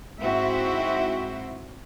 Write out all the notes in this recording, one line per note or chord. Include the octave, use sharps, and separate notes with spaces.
G#2 C4 E4 F#4 E5